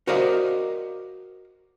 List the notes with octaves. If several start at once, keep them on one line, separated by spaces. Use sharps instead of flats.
F#4 A#4 C5 D5 D#5 F5